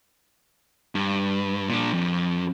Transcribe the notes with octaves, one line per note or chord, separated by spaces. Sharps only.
G2
A#2 D4
F2